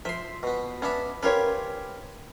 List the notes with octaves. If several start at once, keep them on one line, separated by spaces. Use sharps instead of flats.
F3 E5 C6
B2 B3
B3 C#4 D4 E5
C#4 F4 G4 A#4 B4 C#5